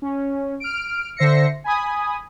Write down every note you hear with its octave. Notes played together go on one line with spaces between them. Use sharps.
C#4
F6 D7
D3 C5 E5 A#6 C7 C#7
G#5 B5 D#6